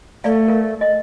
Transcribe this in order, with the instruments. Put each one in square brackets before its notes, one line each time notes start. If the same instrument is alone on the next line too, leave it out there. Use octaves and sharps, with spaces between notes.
[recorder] A3 [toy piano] D5 F5
[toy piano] A#4 F5
D#5